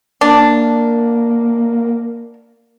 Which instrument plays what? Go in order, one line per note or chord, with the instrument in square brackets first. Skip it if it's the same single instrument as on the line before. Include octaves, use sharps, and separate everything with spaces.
[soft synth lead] A#3 [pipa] D4